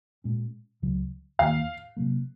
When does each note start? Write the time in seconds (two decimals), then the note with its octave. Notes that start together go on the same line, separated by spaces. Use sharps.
0.24 A#2 G#3 C#4
0.82 C#2 C#3 F#3
1.39 D#2 D#3 A#3 F5
1.97 C3 F#3 A#3